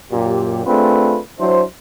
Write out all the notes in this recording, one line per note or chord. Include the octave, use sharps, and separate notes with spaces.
F#2 A#2 G4
A3 C4 D4 F4 G#4 B4
F#3 D4 E4 C5